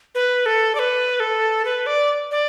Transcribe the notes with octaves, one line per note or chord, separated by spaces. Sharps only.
B4
A4
D5
B4
A4
B4
D5
D5